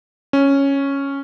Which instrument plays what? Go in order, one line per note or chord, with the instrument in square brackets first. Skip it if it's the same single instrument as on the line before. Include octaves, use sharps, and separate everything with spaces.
[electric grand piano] C#4